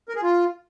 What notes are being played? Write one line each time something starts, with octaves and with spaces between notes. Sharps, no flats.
A#4
G#4
F4